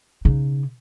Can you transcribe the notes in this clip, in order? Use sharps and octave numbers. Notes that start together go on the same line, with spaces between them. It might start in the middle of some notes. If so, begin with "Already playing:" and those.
C#3 D#4